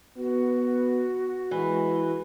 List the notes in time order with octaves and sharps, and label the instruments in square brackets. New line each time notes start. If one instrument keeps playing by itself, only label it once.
[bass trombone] B3 [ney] F#4
[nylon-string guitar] E3 [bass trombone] G#3